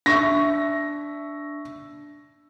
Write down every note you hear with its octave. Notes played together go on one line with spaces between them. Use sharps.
D4 E5 C#6 A#6